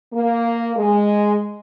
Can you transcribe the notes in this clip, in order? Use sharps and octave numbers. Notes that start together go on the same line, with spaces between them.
A#3
G#3